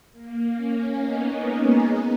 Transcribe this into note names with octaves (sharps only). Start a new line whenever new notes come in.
A#3
A#3 C#4
B3 D#4
G#3
B3 D#4